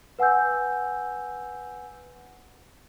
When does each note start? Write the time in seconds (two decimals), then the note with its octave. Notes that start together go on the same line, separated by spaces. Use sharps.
0.19 B4 F#5 G#5 E6 G6